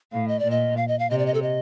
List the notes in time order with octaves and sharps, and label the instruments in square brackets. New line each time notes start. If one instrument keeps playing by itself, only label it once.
[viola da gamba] A2 [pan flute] F5
[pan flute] D#5
[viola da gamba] A#2 [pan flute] D5
[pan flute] D#5
F5
D#5
F5
[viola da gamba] C3 [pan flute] D#5
[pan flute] D5
D#5
A4
D#5